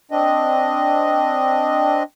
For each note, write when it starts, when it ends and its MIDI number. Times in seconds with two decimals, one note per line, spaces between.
0.11 2.03 60
0.11 2.03 62
0.11 2.03 75